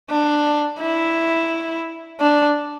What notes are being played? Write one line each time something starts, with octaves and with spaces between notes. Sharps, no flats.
D4
E4
D4